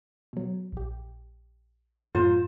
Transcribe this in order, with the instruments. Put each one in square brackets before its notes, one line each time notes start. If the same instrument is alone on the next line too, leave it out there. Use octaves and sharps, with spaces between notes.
[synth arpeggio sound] B2 F#3
A#1 G4
[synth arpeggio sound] F#2 A2 A#5 [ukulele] F4 C5